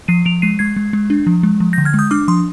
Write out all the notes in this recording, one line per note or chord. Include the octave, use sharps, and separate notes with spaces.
F3 C7 D#7
F3 D7 F7
G#3 C7 D#7
G#3 G#6 C7
G#3
G#3
D4
F3
G#3
F3
G6 A#6
D3
F6 G#6
G#3 D#6 G6
D4 D6 F6
F3 C6 D#6